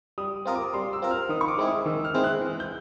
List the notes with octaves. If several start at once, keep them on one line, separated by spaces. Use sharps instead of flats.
G3 D#6
C4 F4 A#4 D#6
D6
G3 C6
E6
C4 F4 A#4
F6
D#3 D#6
C#6
D6
G#3 C4 E4 G#4
D#6
D#3 E6
F6
G#3 C4 E4 G#4
F#6
E3
G6